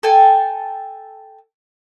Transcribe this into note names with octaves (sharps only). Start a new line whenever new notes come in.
A4 G5 G#5